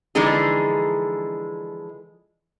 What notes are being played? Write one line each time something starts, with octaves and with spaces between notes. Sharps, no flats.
D3 E3 F3 G#3 D#4 G#4